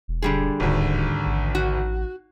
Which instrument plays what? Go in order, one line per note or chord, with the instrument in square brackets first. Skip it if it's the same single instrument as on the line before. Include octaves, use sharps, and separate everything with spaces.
[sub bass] E1
[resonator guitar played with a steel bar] D3 G3 G#4
[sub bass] D1 [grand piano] G#1 D2
[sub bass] A1
[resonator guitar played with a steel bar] F#4